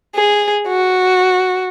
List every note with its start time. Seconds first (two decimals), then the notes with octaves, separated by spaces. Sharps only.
0.16 G#4
0.68 F#4